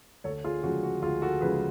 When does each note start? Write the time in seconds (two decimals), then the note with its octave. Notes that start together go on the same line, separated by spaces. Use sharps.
0.24 D2 A4 C#5
0.45 F4 G#4
0.63 C#3 F3 G#3 F#4
0.83 F#4
1.02 D2 F4 G#4
1.22 F#4 A4
1.41 C#3 F3 G#3 G#4 B4